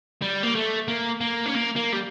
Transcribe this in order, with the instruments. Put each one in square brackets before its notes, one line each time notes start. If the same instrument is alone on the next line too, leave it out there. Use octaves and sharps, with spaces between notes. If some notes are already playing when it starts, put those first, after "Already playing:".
[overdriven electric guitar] G3
A#3
A3
A#3
A#3
C#4
A#3
A#3
G3